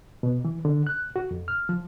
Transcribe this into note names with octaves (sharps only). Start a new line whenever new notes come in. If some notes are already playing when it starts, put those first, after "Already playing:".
B2
E3
D3
F#6
F#4
F2
F6
F3